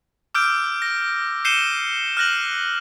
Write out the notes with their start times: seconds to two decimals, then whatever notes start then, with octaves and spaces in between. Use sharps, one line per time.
0.35 D6 E6 F6 G6 D7
0.82 A#6
1.45 G6 C7 C#7 D#7 E7 G7
2.17 F6 F#6 A#6 F#7